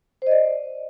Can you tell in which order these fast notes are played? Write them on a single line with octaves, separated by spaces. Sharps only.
C5 D#5 D5